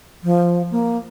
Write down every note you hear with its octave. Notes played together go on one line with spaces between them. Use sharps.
F3
A#3